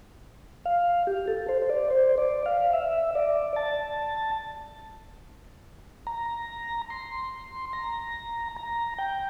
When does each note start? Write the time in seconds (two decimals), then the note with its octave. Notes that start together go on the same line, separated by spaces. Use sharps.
0.66 F5
1.07 G4
1.28 A4
1.49 C5
1.62 C5
1.69 D5
1.90 C5
2.18 D5
2.46 F5
2.73 E5
3.15 D5
3.56 A5
6.07 A#5
6.90 C6
7.73 A#5
8.56 A#5
8.98 G5